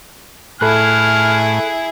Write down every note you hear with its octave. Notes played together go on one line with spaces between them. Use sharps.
A2 E4 G#4 A4 B5 F6 F#6